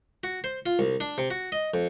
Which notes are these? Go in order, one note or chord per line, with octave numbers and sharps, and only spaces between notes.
F#4
C5
F4
C2
D4
C3
F#4
D#5
F2